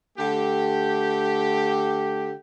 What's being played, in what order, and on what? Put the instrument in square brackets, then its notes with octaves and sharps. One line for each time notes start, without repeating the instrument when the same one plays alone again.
[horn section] D3 A3 G4